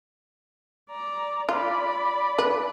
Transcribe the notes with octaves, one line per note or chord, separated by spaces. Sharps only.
D5 A#5
F4 D5 B5
B4